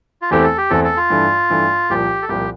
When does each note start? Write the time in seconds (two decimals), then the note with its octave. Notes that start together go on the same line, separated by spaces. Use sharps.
0.22 F4
0.31 E2 E3 A3 C4 G4
0.43 A4
0.58 G4
0.70 E2 E3 A3 C4 A4
0.84 A4
0.97 F4
1.10 G2 E3 A3
1.50 G2 E3 A3
1.90 C2 A#2 F3 G4
2.22 A4
2.29 C2 A#2 F3 G4